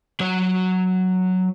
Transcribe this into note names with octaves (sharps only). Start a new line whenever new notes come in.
F#3 C#5